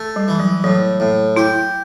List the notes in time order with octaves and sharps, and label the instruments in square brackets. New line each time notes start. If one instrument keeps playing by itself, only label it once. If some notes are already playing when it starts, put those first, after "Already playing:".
Already playing: [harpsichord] A3
[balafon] G3
[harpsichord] E3
[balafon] F#3
[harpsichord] A2 [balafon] F#3
[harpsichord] A2
[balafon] E4 [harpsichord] G4